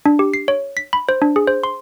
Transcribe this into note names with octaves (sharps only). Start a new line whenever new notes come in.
D4
G4
C7
C#5
B6
B5
C5
D4
G#4
C5
C6